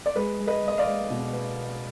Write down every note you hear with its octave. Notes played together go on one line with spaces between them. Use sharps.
D5
G#3 B4
G#3
B4 D#5
G#3 D#5
D5 F5
G#3
B2
B3